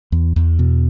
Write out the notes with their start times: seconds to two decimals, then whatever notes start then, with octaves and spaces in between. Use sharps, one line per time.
0.12 E2
0.36 E2
0.59 B2